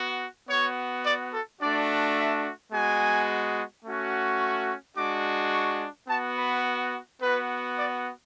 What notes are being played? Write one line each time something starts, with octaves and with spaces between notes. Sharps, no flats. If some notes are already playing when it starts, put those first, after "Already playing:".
Already playing: B3 F#4
B3 F#4 C#5
D5
A4
A3 D4 F#4 D5
E5
G#3 B3 F#4 G#5
A3 C#4 F#4
C#6
G#3 D4 F#4 D6
C#6
B3 F#4 A5
B4
B3 F#4 B4
D5